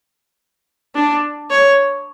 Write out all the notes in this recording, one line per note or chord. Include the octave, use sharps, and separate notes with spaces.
D4
C#5